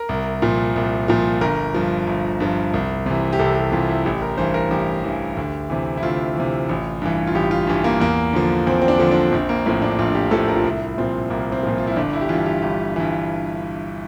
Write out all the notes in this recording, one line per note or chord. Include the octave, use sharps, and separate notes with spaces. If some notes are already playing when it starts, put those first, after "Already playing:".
Already playing: A#4
C2
A#2 F3
C2
A#2 F3
G1 A#4
G2 F3
G1
G2 F3
C2
C3 E3
G4
C2 A4
G4
C3 E3 F4
E4
A1 G4
A#4
G2 E3 C5
A#4
A1 G4
G2 E3
D2
C3 E3
E4
D2 F4
C3 E3
A1
G2 E3
F4
A1 G4
F4
G2 E3
A#3
E2 A#3
D3 F3
E2 C4
C4
D4
D3 F3
D4
A#1 C4
A#3
A2 F3 C4
D4
A#1 F4
G4
A2 F3 A4
A#4
F4
C2 E4
A#2 F3 C4
C2 A#3
C4
A#2 F3
F4
E4
G1 D4
E4
G4
G2 E3 F4
G4
G1 G4
G2 E3